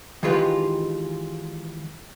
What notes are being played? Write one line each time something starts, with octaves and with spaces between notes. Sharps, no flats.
D#3 E3 G#3 F4 G4 B4